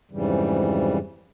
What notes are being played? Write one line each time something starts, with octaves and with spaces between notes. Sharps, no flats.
F2 G#2 C#3 E3 G3